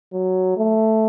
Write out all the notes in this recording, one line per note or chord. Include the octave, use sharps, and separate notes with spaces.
F#3
A3